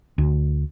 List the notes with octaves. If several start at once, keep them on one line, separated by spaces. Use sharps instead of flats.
D2